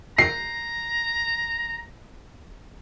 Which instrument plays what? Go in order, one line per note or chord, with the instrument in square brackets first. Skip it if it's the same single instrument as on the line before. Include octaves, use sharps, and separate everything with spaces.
[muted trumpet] A#5 [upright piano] C7